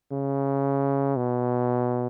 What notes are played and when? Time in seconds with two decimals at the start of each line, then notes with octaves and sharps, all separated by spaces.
0.12 C#3
1.16 B2